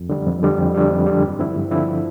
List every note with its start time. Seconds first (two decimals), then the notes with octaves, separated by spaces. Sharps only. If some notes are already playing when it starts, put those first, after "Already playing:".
Already playing: F2
0.09 D3 G3
0.26 F2
0.43 D3 G3
0.58 F2
0.75 D3 G3
0.91 F2
1.07 D3 G3
1.22 G2
1.39 D3 F3 C4 E4
1.56 G2
1.71 D3 F3 C4 E4